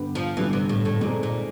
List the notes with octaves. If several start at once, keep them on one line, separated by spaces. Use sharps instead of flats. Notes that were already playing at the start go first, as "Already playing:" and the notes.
Already playing: G2 D3 G3 B3
F3
G2 D3 E3 G3 B3
C3
A2
A2
A#2 G#3 C4 D#4 G#4
A#2